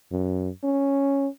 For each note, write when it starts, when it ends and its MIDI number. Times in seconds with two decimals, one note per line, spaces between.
0.12 0.49 42
0.64 1.28 61